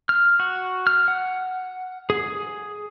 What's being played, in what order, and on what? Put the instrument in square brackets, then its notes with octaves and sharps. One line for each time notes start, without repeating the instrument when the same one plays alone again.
[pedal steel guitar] F6
F#4
F6
F#5
G#4
G#4